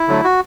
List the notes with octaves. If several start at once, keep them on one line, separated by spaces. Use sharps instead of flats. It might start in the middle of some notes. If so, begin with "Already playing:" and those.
Already playing: E4
D3 F#3 A3
F#4